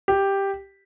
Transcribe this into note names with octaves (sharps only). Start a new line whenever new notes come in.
G4